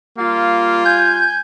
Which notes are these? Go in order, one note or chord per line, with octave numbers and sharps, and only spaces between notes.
G3 A#3 F4
G#5 G6